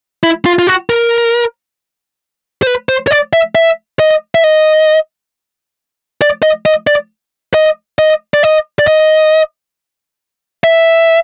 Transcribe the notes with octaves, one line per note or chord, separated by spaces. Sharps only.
E4
F4
F4
F#4
A#4
C5
B4
C5
C#5
D5
E5
E5
D#5
E5
D#5
D5
D#5
D#5
D5
D#5
D#5
D5
D#5
D5
D#5
E5